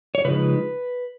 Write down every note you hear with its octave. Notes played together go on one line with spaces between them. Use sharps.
C#5
C#3 F3 G#3 D#4 B4